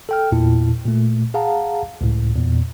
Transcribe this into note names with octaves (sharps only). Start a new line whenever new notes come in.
A4 G5 F6
E2 A#2 E4 A5
A#2 A3
G#4 F5 F#5 A5 A#5
C#2 A2
E2 A#2